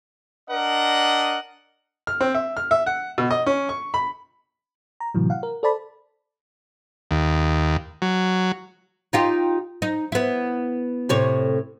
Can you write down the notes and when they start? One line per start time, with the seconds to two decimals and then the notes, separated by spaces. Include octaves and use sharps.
0.49 D4 A#4 D#5 F#5
2.07 F6
2.21 C4
2.35 E5
2.57 F6
2.71 E5
2.86 F#5
3.18 B2
3.31 D#5
3.46 C#4
3.69 C#6
3.94 B5
5.00 A#5
5.14 A2 C3 E3 F#3
5.30 F5 F#5
5.43 A#4
5.63 A4 C5 D5 A5 B5
7.11 D#2
8.02 F#3
9.13 D#4 F4 G4
9.82 D#4
10.12 B3 E4
11.09 A2 C3 C#5